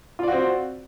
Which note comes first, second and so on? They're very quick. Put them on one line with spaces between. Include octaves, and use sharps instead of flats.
F4 D5 F#4 C4